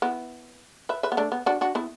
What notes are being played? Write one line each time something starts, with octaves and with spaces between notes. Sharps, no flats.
B3 E4
B4 E5
B4 E5
B3
A3 D4
B3
D4 F#4
D4 F#4
B3 E4